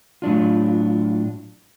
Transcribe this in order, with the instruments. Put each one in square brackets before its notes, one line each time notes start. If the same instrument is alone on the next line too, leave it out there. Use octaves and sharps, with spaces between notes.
[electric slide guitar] A2 F#3 D4 F4